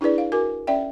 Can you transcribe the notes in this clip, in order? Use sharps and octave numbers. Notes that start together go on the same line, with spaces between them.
D4 E4 G#4 B4 D5
F5
F#4 A#4 G#5 D6
C#4 D5 E5 G5